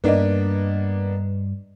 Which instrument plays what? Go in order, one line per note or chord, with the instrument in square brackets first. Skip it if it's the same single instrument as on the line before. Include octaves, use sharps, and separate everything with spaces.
[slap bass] G2 [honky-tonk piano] A#3 B3 D4 [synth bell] B4 D5 D#5